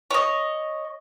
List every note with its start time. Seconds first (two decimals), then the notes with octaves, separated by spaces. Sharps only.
0.11 C#5 D#5